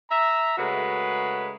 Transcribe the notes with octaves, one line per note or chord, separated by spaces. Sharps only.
E5 A#5
C#3 G#3 A3 F#4 A#4 B4